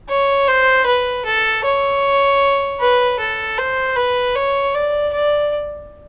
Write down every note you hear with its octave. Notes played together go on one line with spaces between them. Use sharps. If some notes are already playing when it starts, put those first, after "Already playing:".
C#5
C5
B4
A4
C#5
B4
A4
C5
B4
C#5
D5
D5